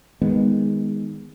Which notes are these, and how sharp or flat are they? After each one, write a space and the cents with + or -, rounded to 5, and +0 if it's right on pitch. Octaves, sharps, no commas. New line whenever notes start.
D#3 +0 G#3 -15 B3 +0